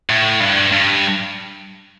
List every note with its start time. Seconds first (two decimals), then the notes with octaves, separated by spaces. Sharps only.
0.10 A2
0.40 G2
0.72 G2